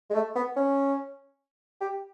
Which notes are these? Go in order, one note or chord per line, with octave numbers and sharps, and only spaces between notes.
G#3
A3
B3
C#4
G4